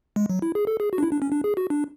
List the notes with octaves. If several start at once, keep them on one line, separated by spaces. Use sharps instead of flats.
G#3
F#3
E4
G#4
A4
G#4
F#4
D4
E4
D4
C#4
D4
G#4
F#4
D4